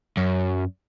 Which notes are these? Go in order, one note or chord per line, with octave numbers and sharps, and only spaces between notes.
F#2